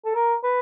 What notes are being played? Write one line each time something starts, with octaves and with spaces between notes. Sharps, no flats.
A4
A#4
B4